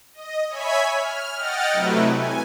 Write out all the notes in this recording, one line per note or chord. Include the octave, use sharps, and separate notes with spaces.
D#5
C#5 E5 G#5 B5 G#6 B6
F6
D#5 F#5 G5 F6 A6
C3 F#3 A3 E4 B4
G#5